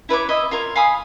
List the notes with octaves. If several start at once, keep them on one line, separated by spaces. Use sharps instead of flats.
E4 B4 C#5 D6
D#5 E5 B5
F4 A#4 C#5
F5 G#5 B5 D#6